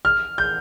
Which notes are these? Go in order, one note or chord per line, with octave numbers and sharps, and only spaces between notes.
F6
G6